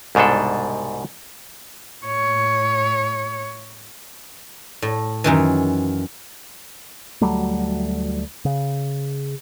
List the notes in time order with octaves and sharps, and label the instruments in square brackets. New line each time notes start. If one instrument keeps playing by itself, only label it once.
[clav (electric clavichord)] C2 G#2 B2 D4 A4
[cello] A2 C#5
[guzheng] A2
F#2 D#3 E3
[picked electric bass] D2 F#3 G3 A3
C#3